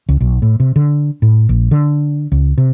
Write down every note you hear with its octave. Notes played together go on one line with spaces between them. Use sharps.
C#2
B1
A2
C3
D3
A2
A#1
D3
C#2
C3